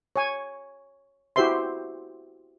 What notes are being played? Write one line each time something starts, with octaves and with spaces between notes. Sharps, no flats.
C#5 G#5
E4 F#4 G4 C5 E5 C6